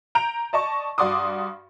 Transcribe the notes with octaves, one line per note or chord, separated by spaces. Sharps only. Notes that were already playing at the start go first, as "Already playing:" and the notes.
A#5 G6 D7 F7
D5 D#5 A5 C#6
G2 F#4 D5 C6 D6 D#6